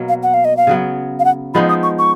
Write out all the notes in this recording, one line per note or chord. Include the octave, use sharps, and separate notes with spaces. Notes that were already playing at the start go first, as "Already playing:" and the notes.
Already playing: B2 F#3 A#3
F5
F#5
F5
D#5
F5
C#3 F#3 B3
F5
F#5
F3 G#3 B3 D#4 B5
D#6
C#6
C#6